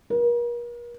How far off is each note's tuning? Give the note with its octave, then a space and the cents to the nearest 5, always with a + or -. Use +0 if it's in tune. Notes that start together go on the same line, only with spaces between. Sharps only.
A#4 +40